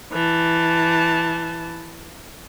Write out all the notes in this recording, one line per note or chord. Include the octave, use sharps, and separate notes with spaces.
E3 A5